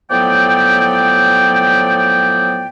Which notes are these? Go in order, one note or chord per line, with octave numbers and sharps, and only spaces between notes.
A2 F3 F#3 B3 D5 G5